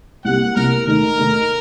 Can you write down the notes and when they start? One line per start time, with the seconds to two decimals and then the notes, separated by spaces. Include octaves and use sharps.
0.25 C2 C3 G3 A#3 F#5
0.55 C2 C3 G3 A#3 A#4
0.87 D#2 D#3 A3 D#4 A#4
1.18 D#2 D#3 A3 D#4